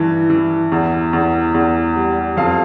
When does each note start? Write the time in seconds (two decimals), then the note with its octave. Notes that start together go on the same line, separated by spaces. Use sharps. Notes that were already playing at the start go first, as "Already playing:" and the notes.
Already playing: G2 E3
0.30 E3
0.72 E2
1.13 E2
1.54 E2
1.96 G3
2.37 F2 F5